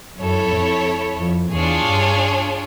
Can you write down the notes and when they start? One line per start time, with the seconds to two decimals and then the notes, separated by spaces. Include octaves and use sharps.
0.18 F#2 E4 A4 C#5
0.52 F2
1.19 F2
1.52 E2 D4 F4 G#4 C#5
1.86 G2